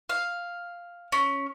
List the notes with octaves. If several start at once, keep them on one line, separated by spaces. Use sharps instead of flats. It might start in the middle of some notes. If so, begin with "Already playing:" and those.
F5
C#4